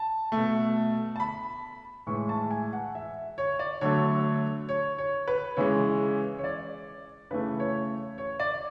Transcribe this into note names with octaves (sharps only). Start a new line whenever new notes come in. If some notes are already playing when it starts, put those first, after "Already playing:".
Already playing: A5
B2 A3
A5
B5
A2 E3 G#3 C#6
A5
G#5
F#5
E5
C#5
D5
D3 F#3 A3 C#5
C#5
C#5
B4
C#3 E3 G#3 C#5
C#5
D5
C#3 E3 A3 B4
C#5
C#5
D5